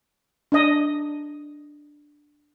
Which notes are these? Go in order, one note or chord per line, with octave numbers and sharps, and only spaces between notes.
D4 D#5